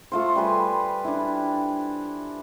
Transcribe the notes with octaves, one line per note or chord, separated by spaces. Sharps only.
A3 F4 C5
G3 B4 G#5
D4 E4